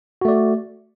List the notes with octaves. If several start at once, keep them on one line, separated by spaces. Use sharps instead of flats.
A3 F#4 D5